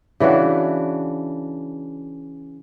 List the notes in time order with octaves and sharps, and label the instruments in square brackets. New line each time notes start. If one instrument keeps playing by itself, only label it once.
[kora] C#3 E3 D4 F#4